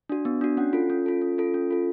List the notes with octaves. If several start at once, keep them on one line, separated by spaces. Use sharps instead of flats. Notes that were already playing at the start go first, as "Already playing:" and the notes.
D4 F#4
B3
D4 F#4
C#4 F#5
F4 A4
C#4
F4 A4
C#4
F4 A4
C#4
F4 A4